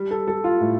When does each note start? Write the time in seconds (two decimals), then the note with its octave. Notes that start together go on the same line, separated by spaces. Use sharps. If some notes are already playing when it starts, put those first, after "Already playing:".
Already playing: G3
0.11 A4
0.27 G3 A4
0.44 F4
0.61 A2